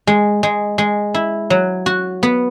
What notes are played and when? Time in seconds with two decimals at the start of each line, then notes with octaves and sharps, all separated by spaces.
0.07 G#3
0.43 G#3
0.78 G#3
1.14 E4
1.50 F#3
1.86 F#4
2.23 B3